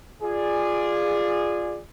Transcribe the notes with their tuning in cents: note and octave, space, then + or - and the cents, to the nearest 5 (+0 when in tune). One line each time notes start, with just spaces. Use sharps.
F4 +0 G#4 -10 D5 +10